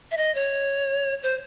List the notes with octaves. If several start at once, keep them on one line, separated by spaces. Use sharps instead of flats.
E5
D#5
C#5
C5